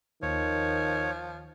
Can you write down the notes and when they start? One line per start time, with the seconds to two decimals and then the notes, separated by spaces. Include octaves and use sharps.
0.22 D#2 D#3 F3 C#5